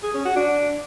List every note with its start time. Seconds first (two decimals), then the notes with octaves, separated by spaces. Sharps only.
0.03 G#4
0.14 C#4
0.25 F#4
0.36 D4